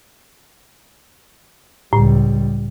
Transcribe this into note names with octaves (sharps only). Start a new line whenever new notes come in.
C#2 A2 G3